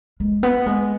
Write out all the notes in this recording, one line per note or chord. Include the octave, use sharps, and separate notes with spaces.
G#3
B3
G#3